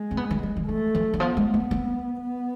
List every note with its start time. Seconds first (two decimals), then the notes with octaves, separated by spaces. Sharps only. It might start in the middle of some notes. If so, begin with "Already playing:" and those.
Already playing: G#3
0.11 C4
0.17 B3
0.31 E3
0.43 E3
0.57 E3
0.68 E3 A3
0.95 F3
1.14 E3
1.20 F3 B3
1.37 G#3
1.54 A3
1.71 C4
2.22 B3